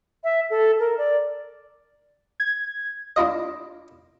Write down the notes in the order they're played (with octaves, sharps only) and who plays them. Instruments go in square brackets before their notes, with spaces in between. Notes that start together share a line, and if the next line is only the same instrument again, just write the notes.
[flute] E5
A4
A#4
D5
[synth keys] G#6
[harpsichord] D4 E4 F4 D#5